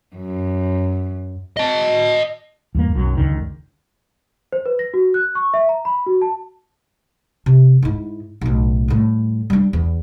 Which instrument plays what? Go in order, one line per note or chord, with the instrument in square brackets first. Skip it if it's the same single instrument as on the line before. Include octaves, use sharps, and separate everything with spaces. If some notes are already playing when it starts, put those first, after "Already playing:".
[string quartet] F#2
[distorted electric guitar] D#5 A5
[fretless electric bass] E2 G2 A#3
B1 F#2 F#3
F#1 C#2 D3 D#3
[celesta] C5
B4
A#6
F#4
F#6
C#6
E5
A#5
B5
F#4
A5
[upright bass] C3
G#2 E4
B1 A2
A2 G3
G3 D4
E2